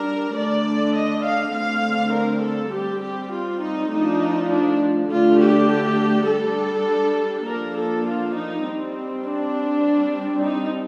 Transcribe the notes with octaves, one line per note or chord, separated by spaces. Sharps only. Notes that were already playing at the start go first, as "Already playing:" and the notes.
Already playing: G3 D4 A#4
D3 A3 D4 D5
D#5
F5
D3 A3 C4 F5
A#4
A4
G3 C4 G4
G4
F4
D#4
F3 A3 D4 D#4
D4
D3 A3 D4 F4
G4
G3 D4 A4
F3 A#3 D4 A#4
A4
F4
D#4
G3 C4
D4
G3 C4
D#4